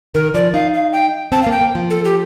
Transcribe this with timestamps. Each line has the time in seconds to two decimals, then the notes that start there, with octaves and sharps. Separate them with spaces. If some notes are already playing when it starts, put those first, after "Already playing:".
0.15 D#3 A#4
0.34 F3 D5
0.54 D#4 F5
0.74 F5
0.93 G5
1.32 C4 A5
1.43 A#3 F5
1.52 G5
1.61 A#3
1.75 F3
1.90 A4
2.05 G4